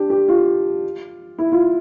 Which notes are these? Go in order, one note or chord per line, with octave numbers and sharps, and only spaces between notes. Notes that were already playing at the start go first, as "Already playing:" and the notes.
Already playing: D4 G4
G4
F4
E4
F4